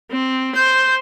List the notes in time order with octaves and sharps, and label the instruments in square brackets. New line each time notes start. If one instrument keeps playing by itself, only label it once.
[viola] C4
[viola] C5 [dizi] G6